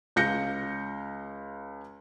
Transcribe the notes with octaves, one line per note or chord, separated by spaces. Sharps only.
C#2 F5 G6 A#6 C#7